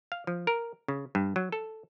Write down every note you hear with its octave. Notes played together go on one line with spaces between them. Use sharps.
F5
F3
A#4
C#3
G2
F#3
A4